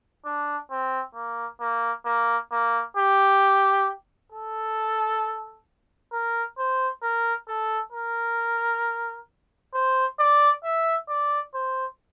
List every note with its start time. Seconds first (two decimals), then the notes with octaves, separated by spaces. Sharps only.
0.26 D4
0.71 C4
1.15 A#3
1.61 A#3
2.05 A#3
2.51 A#3
2.97 G4
4.32 A4
6.12 A#4
6.58 C5
7.02 A#4
7.48 A4
7.92 A#4
9.74 C5
10.19 D5
10.64 E5
11.09 D5
11.54 C5